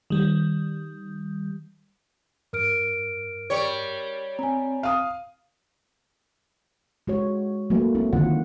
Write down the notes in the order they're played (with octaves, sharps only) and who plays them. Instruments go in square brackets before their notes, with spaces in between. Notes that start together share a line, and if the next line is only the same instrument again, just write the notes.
[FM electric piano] D#3 G3
[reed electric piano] G2 [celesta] A#4 F6 D7
[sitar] G3 C#5
[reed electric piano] C4 [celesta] G#5 A#5
[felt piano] F5 D#6
[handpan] G#3 F#4 C#5
F#3 A3 A#3 F#4 B4
C4 E4
D3 D#3 F#3 F4 F#5